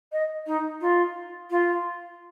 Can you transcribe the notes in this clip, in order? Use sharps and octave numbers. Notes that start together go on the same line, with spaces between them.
D#5
D#4
F4
F4